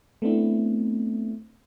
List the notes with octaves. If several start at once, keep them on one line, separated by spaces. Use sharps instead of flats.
A3 B3 C4 D4 E4